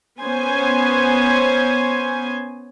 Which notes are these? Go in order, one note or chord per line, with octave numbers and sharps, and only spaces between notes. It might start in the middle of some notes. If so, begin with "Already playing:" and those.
B3 C#4 C5 G#5